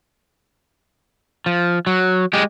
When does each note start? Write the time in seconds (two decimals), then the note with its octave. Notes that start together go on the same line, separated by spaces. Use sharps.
1.46 F3
1.87 F#3
2.33 G#3 G4